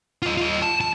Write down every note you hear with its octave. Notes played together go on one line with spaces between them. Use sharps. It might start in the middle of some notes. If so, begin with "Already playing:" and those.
F4 D#5
F4 D#5
A5
A5